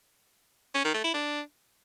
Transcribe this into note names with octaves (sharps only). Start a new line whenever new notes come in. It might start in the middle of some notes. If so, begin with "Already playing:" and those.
C#4
D#3
A3
E4
D4